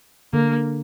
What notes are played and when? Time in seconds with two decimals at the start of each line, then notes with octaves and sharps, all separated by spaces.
0.33 D3 A#3